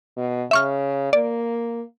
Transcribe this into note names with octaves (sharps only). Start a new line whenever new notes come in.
B2
C#3 E5 C#6 F6
A#3 D5